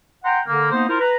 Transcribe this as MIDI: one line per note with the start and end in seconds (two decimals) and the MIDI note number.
0.24 0.39 78
0.24 0.39 79
0.24 0.39 82
0.24 0.39 84
0.47 0.70 50
0.47 0.70 58
0.72 0.85 58
0.72 0.85 59
0.72 0.85 63
0.72 0.85 72
0.88 0.96 64
0.88 0.96 65
0.88 0.96 70
0.88 0.96 72
0.99 1.16 71
0.99 1.16 82